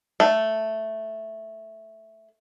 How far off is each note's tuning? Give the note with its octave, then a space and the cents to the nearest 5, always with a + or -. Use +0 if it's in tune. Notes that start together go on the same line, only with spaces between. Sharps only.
A3 +0 A5 +0